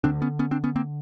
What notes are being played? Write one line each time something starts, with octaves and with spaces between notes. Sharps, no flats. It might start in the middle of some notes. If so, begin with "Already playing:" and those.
D2 D3 C4 D4
B3 C#4
B3 C#4
C4 D4
B3 C#4
A#3 C4